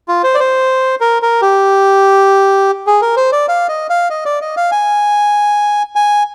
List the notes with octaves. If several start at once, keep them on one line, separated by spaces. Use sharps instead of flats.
F4
C5
D5
C5
A#4
A#4
G4
G#4
A#4
C5
D5
F5
D#5
F5
D#5
D5
D#5
F5
G#5
G#5